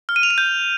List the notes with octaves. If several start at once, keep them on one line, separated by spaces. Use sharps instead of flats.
F6
D#7
F7
D#7
G6